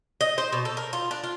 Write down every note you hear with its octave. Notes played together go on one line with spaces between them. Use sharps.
D#5
C5
B2
A4
A#4
F4
D4
F4